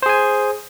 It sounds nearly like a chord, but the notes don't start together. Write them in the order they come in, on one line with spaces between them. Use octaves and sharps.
C5 G#4 G#5